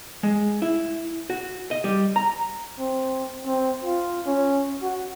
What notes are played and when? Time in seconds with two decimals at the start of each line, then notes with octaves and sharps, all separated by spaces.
0.23 G#3
0.62 E4
1.30 F#4
1.71 D#5
1.84 G3
2.16 A#5
2.79 C4
3.46 C4
3.84 F4
4.27 C#4
4.83 F#4